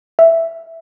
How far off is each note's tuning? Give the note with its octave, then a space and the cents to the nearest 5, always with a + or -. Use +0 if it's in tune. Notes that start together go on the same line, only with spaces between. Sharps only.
E5 +0